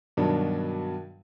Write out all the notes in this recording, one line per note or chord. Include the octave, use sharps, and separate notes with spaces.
G2 B2 D#3 F#3 D4